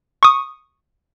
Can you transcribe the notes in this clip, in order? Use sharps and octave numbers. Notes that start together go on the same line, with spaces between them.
C#6 D#6